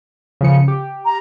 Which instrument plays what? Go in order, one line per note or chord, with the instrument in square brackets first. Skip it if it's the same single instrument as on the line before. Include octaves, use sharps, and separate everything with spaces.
[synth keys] C#3 F3 C#7
G4
[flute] A#5